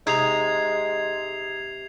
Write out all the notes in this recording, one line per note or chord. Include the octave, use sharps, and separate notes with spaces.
C3 G#3 D#4 G#6 C7 F7